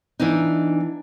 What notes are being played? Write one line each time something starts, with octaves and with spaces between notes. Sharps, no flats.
E3 B3 D4 D#4